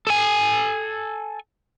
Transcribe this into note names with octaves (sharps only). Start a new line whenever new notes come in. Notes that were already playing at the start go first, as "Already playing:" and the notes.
A4 G#5